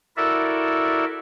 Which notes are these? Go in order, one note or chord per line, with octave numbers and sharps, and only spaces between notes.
E4 F#4 A4 A#4 D5 E5